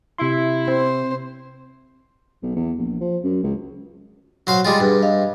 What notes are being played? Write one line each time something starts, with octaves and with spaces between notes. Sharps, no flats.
C3 E4 C6
C4 C5
B1
E2
A#1
F3
F#2
C#2
F#3 C5 F5
G3 G#3 F4 G5
G2 G#4 B4
D#5 F5